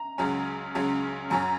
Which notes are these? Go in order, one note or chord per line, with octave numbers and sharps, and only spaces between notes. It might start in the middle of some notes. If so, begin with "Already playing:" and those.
Already playing: A#5
C#2 C#3 F#3 C#4
C#2 C#3 F#3 C#4
F#2 F#3 C#4 G#5